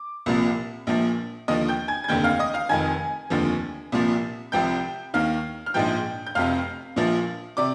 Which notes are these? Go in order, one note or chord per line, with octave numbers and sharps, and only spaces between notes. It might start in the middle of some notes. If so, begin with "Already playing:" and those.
Already playing: D6
C2 A#2 F3
A#1 A#2 F3
D#2 D3 F3 D#5 D#6
G5 G6
G#5 G#6
G#6
F1 D#2 D3 G5 G6
F5 F6
D#5 D#6
F5 F6
F1 F2 D#3 G#5 G#6
F1 D#2 D3 F3
C2 A#2 F3
C2 C3 F3 G5 G6
D#2 D#3 F5 F6
F6
A#1 G#2 F3 G5 G6
G6
F1 F2 C3 F5 F6
A#1 A#2 F3
C3 D5 D6